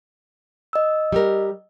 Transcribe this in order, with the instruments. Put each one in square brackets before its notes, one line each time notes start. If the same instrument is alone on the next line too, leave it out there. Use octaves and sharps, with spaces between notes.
[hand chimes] D#5 E6
[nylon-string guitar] G3 G4 A#4